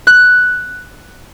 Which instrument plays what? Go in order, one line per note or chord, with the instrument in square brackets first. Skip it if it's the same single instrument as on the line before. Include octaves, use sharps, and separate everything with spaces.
[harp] F#6